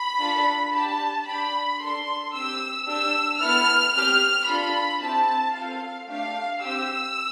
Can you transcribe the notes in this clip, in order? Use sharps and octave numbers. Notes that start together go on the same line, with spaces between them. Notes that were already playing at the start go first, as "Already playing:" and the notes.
Already playing: B5
D4 F4 A4
D4 G4 A5
D4 G4 B5
D4 A4 C6
C4 G4 E6
D4 G4 E6
B3 E4 A4 F6
C4 G4 F6
D4 F4 A4 B5
C4 E4 G4 A5
C4 F4 A4 F5
A3 D4 G4 F5
C4 G4 E6